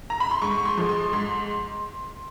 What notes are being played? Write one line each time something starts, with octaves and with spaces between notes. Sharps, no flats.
A#5
B5
C6
G#2 C#6
C#6
C6
F3 G#3
C6
G#2 C6